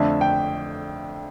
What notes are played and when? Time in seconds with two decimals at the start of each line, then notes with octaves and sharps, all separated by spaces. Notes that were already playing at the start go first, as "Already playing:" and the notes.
Already playing: F2 D3 A3 D4 E5
0.21 G5